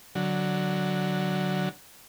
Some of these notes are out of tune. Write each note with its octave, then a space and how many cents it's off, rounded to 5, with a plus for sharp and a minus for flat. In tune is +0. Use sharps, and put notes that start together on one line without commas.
D3 +0 F#3 +0